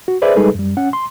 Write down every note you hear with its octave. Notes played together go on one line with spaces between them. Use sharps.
F#4
G#4 B4 C5 D5 E5
G3 G#3 D#4 G#4 A4 B4
F#2 G3
C#4 F#5
C6